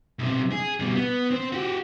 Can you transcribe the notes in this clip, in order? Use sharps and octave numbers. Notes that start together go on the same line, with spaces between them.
B1 C3
G#4
B2 G3
B3
C4 C5
F#4 G4